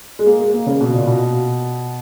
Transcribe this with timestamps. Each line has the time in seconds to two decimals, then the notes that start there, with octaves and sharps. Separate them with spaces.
0.19 G#3
0.26 A#3
0.40 G#3
0.53 A#3
0.67 C#3
0.81 B2
0.94 A#2
1.07 B2